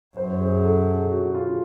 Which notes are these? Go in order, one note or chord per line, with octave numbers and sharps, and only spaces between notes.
F#2 C5
G#4
A4
G#4
F#4
F4